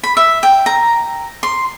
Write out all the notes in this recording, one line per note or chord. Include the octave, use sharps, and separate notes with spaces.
B5
E5
G5
A#5
C6